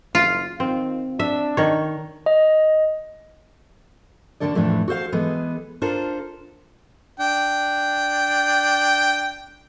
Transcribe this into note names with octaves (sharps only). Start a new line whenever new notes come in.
F#1 F4
D#3 C4
D4 E5
D#3 C#5
D#5
D#2 B2 D3 D4 A4 D5
F2 A2 E3 A3 D4
F#4 A4 C5 F5
E3 G#3 B3 G#4 A4 B4
D4 F4 A4 A#4 C5
D4 G5